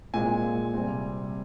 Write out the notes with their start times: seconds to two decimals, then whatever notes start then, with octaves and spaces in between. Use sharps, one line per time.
0.14 A#2 G#3 C4 G#5
0.74 C3 G3 C4